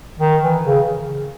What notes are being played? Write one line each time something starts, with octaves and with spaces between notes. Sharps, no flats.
D#3
E3
C#3